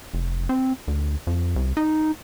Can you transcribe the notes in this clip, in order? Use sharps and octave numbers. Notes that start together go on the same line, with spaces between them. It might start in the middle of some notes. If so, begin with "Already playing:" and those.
F1
C4
D2
F2
C2
D#4